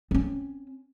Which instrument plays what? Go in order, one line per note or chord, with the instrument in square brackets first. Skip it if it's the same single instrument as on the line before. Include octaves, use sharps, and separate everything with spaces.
[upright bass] C4 C#4